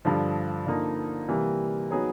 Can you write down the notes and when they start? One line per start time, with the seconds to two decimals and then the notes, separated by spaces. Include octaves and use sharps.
0.05 G2 D3 F3
0.67 D3 F3 A#3 D#4
1.28 C3 E3 G3 A#3
1.91 F#3 B3 D#4 G#4 C#5